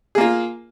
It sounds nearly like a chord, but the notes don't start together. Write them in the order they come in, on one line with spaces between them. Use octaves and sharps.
G#4 A#3 F4